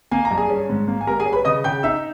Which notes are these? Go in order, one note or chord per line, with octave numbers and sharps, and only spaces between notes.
A#3 G#5
A#5
G2
G#4 G#5
C#4
G#2
A#3
G#5
G3 A#4 A#5
G#4 G#5
C#4
B4 B5
C#3 D#5 D#6
C#3 G5 G6
D#4 E5 E6